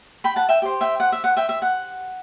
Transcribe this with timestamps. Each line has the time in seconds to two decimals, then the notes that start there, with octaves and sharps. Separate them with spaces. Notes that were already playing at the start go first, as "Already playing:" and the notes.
0.24 G5 B5
0.36 F#5 A5
0.49 E5 G5
0.62 G4 C5
0.81 E5 G5
1.00 F#5
1.12 E5
1.24 F#5
1.37 E5 G5
1.49 E5
1.62 F#5